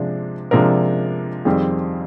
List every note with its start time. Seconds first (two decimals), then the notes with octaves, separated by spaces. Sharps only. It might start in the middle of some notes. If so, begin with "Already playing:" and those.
Already playing: C3 F3 G#3 D4
0.51 C3 F3 G#3 D4 A#4
1.45 F2 D#3 G3 C4 G#4